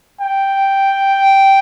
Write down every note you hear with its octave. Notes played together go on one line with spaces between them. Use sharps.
G5